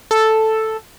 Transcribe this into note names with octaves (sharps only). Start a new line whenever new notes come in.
A4